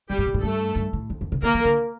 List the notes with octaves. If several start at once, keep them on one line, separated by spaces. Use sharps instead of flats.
A#2 G3 G4
A2
A#2
A2
G2 A3 A4
G2
A2
F2
F2
C3
D3 A#3 A#4
E3
D3